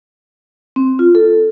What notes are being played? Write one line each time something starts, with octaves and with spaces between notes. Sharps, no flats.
C4
F4
A4